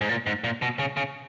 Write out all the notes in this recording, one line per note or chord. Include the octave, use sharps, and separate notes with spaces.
G#2
A#2
G#2
A#2
B2
C#3
C#3